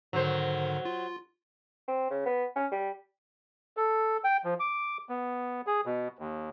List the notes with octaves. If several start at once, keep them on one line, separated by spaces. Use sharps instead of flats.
G#2 D3 D#3 F#3 C5
F4
C4
C#3
B3
C#4
G3
A4
G5
F3
D6
B3
G#4
B2
D#2